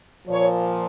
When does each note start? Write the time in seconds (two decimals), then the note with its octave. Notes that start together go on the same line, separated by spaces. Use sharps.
0.28 A#2 F3 C#5